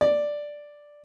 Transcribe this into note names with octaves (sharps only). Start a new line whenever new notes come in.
D5